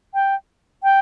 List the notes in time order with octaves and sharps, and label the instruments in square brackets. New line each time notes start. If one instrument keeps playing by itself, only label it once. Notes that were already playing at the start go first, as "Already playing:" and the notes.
[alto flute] G5
G5